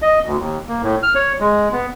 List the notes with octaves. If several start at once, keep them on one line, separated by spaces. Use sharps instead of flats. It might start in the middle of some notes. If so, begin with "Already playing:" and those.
D#5
D2
D#2
A#3
A2
F6
C#5
G#3
B3